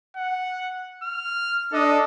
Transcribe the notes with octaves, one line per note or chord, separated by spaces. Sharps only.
F#5
F6
D4 A4 D#5